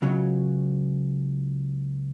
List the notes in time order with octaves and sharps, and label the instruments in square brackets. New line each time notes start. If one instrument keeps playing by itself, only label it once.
[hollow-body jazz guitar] C#2 C#3 F#3